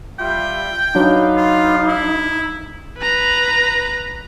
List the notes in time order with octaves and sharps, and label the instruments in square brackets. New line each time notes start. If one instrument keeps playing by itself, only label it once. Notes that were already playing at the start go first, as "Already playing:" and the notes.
[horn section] G3 F4 [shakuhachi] E5 [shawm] G5
[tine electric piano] F#3 D4 [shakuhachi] D#4 [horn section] B4 D5 F5
[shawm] F4
E4
[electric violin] B4 A#5